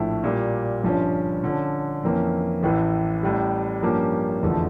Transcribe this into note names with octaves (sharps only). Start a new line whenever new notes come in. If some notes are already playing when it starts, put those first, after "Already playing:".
Already playing: A#1 A2 F3 A3 E4
A#2 G3 A#3
G1 G2 F3 C#4
D3 F3 C#4
F2 E3 A#3 C#4
A1 A2 E3
A1 A2 G3
G2 F3 A#3 C#4 G4
F1 E2 D3 F3 A3